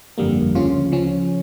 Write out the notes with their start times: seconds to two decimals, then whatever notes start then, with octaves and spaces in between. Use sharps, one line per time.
0.18 G1 F2 D3 G3 A#3
0.55 D2 C#3 F3 C#4 F4
0.92 C#3 F3 C#4